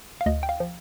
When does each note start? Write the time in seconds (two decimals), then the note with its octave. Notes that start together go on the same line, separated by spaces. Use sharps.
0.21 F5
0.26 D2 D#5
0.43 G5
0.49 F5
0.60 F3